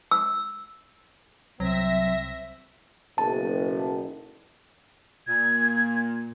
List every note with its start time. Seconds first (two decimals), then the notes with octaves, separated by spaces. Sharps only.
0.11 E6
1.60 C2 F#3 C4 E5 A#6
3.18 F#1 B1 A5
5.27 A#2 G#6